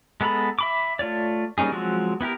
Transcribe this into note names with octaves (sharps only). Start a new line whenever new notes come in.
G#3 B3 A4 A#5 B5
E5 B5 D6
A3 F4 C#5 D5
G3 A#3 C#4 D#4 G#4
F3 F#3 G#3 C4 F#4
B3 E4 G4 A#4